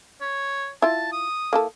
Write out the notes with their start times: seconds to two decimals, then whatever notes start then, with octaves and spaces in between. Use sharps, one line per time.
0.21 C#5
0.82 E4 F4 A5
1.12 D#6
1.53 A#3 E4 A4